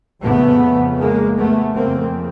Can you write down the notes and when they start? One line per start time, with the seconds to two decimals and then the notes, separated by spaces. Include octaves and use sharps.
0.23 F2 C#3 A3 B3
1.00 G#3 A#3
1.38 A3 B3
1.76 F2 C#3 A#3 C4